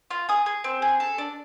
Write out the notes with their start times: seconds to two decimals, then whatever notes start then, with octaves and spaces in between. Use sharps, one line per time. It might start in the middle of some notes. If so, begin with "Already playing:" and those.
0.11 F4
0.29 G#4 D#6
0.46 G#4
0.64 C4
0.82 G#4
1.00 A4
1.18 D4